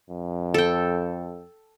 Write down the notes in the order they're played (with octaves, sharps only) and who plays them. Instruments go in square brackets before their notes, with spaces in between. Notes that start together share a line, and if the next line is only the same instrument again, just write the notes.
[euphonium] F2
[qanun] A4 G5